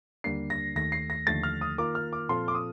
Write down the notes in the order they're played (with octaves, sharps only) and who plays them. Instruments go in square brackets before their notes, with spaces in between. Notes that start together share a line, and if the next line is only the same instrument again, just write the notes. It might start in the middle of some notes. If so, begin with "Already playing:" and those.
[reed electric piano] D#2 D3 G3 A#3 D4 [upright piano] C7
[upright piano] A#6
[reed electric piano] D#2 D#3 A3 [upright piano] A#6
[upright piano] C7
A#6
[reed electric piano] D#2 D3 F3 A3 [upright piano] A6
[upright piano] F6
D#6
[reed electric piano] D#3 A#3 F4 A#4 [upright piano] D6
[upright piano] F6
D6
[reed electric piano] A#2 F3 C4 F4 A4 [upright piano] C6
[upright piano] D6
D#6